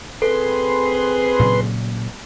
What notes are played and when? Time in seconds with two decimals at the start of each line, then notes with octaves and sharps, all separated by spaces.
0.22 C4 G#4 A4 B4 C6
1.39 A#2 C#3 F#3